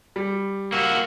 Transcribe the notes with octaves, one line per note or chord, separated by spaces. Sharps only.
G3
A#3 F#4 E6